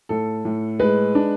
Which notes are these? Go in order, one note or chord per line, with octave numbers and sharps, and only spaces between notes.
A2 A4
A2
G#3 B4
D4